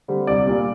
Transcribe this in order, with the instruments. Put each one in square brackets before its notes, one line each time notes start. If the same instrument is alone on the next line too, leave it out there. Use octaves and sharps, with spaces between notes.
[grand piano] D3 G3 C4
C2 D5
A#2 G3 A#3